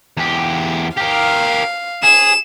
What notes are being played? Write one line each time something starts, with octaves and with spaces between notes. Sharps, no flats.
E2 G4
G4 A#4 F5
G#4 E7